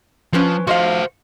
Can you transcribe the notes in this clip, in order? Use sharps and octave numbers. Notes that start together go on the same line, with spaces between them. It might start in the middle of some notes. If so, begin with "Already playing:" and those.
F3 C#4 B4 C5
F3 F#4 C5 D#5 F5